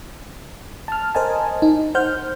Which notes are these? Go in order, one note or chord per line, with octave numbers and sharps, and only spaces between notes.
A5 F6
A#4 C5 D#5 G#5 A5
D#4
C5 F#5 F6 G6